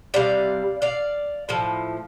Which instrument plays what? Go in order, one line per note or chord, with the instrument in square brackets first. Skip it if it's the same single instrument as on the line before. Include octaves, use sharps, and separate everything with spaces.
[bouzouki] C3 G3 D5 F5
D5 F5
A2 F3